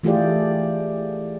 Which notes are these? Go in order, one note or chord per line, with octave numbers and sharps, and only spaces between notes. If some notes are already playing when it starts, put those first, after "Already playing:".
E3 A3 F4 G4 G#4 D5